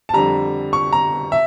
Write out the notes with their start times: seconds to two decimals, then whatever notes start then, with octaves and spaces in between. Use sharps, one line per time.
0.09 A5
0.13 F2 D3 G3 A#5
0.73 C#6
0.93 A#5
1.32 E5